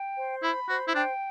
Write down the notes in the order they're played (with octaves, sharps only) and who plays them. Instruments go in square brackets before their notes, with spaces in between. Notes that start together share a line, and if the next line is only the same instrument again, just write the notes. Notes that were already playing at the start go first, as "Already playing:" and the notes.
Already playing: [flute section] G5
C5
[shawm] E4 [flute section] B5
[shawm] F#4 [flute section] C5
[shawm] E4
[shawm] D4 [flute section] G5